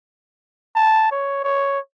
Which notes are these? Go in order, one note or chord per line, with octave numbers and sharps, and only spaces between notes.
A5
C#5
C#5